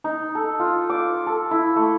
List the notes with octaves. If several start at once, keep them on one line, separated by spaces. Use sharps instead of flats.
D#4
A4
F4
D6
A4
E4
A3